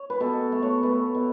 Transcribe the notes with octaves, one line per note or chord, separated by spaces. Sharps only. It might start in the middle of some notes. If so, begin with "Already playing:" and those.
Already playing: C#5
B4
B2 A4
A3
C#5
A3 B4
B2